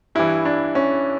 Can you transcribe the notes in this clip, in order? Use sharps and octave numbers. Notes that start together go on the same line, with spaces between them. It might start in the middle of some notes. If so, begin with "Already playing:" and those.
G2 E3 E4
D4
C#4